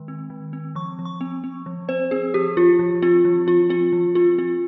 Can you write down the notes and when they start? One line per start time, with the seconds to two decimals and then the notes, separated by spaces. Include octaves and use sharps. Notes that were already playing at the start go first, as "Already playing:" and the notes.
Already playing: D#3 G#3
0.08 C4
0.30 D#3
0.53 C4
0.75 F3 C#6
0.99 F3
1.05 C#6
1.21 C4
1.44 C4
1.66 F3
1.88 C4 C5
2.11 C4 G#4
2.34 F3 G4
2.57 F3 F4
2.79 F3
3.02 C4 F4
3.25 F3
3.47 F3 F4
3.69 C4 F4
3.92 F3
4.15 C4 F4
4.38 C4 F4